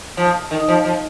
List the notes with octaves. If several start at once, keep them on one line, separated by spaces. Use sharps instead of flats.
F3
D#3
F3
F3